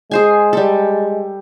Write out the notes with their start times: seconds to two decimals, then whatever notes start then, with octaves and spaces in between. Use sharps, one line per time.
0.11 G#3 G#4 C5 G#5
0.53 G3 A4